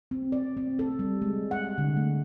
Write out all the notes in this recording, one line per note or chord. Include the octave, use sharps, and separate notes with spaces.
C4
D5
C4
A4
G3
G#3
F#5
D3
A3